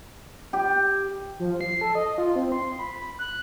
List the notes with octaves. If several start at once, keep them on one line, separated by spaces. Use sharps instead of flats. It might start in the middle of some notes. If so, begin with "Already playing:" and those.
G4
F3
C7
A4
D#5
F4
C4
C6
B5
F#6